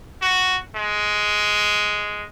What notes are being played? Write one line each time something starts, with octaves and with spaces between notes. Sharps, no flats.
F#4
G#3